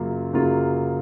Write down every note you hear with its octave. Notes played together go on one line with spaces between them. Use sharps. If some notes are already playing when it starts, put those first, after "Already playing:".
Already playing: F#2 C#3 F#3 A#3 F4
F#2 C#3 F#3 A#3 F4